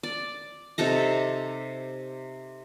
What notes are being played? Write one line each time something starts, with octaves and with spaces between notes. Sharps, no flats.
D5
C3 D#4 A4 A#5